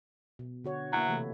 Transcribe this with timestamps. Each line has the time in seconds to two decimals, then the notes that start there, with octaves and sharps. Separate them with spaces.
0.39 B2
0.64 D3 F#4 C#5
0.93 F#3 A#3 E4
1.09 C3 E3 A3